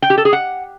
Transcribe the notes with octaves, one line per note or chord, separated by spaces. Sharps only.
G5
G4
A4
G#4
F#5